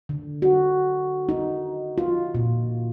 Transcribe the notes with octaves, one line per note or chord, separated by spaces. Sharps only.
D3
F#4
D#4
F4
A#2